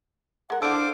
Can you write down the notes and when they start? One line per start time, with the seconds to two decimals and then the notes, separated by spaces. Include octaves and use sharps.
0.50 G#3 A#4 F#5
0.62 D4 E4 A4 C5 F5 D6 E6 D7